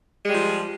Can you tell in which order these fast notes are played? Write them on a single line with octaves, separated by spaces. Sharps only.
G#3 G3 F3